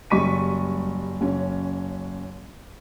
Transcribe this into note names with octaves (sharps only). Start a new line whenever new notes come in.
F#1 G3 C#6 B6 D#7
F#1 C#4